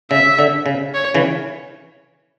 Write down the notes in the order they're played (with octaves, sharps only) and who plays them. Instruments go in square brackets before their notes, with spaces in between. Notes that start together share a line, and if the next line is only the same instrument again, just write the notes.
[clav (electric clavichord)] C#3 [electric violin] E5
[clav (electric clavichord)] D3
C#3
[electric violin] C#5
[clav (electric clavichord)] C#3 E3